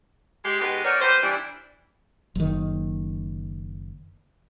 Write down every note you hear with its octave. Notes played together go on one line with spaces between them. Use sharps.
G#3 G4
B2 G#3 B3 D#4 G4 B4
B3 D#4 F#4 A#4 C#5 D5
A#3 G4 B4 C5
E3 G3 D4
F#1 D#3